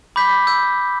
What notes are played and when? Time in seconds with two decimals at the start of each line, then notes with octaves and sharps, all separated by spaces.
0.16 B5 D6 G6 B6
0.47 E6 G6